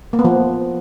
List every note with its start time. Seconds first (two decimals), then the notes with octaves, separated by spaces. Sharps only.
0.13 A#3
0.19 B3
0.24 F3